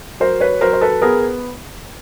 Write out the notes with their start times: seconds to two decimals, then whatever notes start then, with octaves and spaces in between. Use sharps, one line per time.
0.20 F#3 A#4 C5
0.40 B4 C#5
0.61 F#3 A#4 C5
0.73 C5
0.81 A4 B4
1.02 B3 G#4 A#4